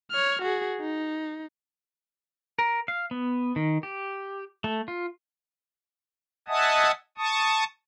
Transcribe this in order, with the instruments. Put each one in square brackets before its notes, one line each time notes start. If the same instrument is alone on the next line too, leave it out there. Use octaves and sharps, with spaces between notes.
[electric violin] C#5 F6
F#4 G#4
D#4
[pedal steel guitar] A#4
F5
B3
D#3
G4
A3
F4
[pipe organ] D#5 E5 F#5 G#5 A5 D#6
A5 C#6 D#6